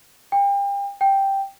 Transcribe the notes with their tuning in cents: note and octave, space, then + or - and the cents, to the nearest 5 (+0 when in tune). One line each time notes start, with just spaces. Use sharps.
G5 +35
G5 +0